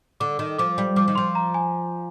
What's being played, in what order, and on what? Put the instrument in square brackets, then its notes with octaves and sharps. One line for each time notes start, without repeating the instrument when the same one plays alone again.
[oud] D3 [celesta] D6
[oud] D#3
[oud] F3 [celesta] D6
[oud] G3
[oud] F3 [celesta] D6
[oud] D#3
[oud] F3 [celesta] C6
[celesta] A#5
G#5